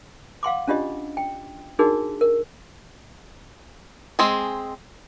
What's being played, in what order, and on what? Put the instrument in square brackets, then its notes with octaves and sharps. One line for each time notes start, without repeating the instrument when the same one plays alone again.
[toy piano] F5 F#5 C6 D6
C#4 D4 F4 G4 D#5
G5
D4 D#4 F#4 G#4 A#4
A#4
[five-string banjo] G#3 C4 G#4